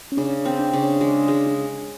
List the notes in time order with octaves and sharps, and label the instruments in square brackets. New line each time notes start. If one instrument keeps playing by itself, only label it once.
[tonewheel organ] C#4
[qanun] C#3 [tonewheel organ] D4
[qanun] C4
[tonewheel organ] D4
[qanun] C#3
G#3
G#3